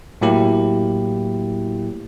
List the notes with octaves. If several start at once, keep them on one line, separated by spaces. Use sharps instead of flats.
A2 F#3 A#3 E4 G4